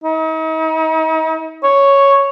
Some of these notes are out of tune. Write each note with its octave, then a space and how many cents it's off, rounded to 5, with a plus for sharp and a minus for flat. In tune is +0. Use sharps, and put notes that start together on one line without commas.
D#4 +40
C#5 +0